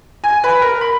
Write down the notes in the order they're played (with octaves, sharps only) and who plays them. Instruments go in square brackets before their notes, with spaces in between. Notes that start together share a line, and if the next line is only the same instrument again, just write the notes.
[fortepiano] G#5
B4
A#4
B5